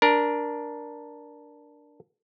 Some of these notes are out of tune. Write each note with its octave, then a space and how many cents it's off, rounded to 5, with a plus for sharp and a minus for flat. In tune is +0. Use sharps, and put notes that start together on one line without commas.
D4 +0 A#4 +15